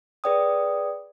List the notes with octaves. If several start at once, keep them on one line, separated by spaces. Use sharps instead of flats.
G#4 B4 D5 G5 D#6